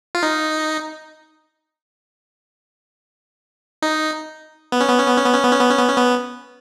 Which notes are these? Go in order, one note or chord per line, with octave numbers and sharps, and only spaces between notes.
F4
D#4
D#4
B3
C#4
B3
C#4
B3
C#4
B3
C#4
B3
C#4
B3
C#4
B3
C#4
B3